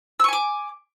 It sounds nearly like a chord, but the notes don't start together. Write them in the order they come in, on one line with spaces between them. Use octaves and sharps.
E6 C#6 G#5 D6